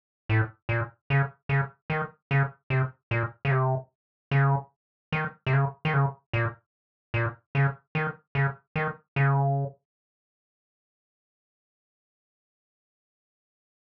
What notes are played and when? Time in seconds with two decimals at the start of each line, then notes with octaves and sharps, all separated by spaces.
0.29 A2
0.69 A#2
1.10 C#3
1.49 C#3
1.90 D#3
2.31 C#3
2.70 C3
3.11 A#2
3.45 C#3
3.51 C3
4.31 C#3
5.12 D#3
5.47 C3
5.53 C#3
5.85 D#3
5.94 C#3
6.33 A#2
7.14 A#2
7.55 C#3
7.95 D#3
8.35 C#3
8.76 D#3
9.16 C#3